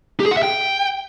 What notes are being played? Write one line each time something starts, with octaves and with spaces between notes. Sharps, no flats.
G4
G#4
F#5
E5
G5